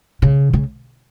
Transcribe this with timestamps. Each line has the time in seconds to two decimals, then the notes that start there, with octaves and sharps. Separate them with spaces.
0.22 C#3
0.53 C#3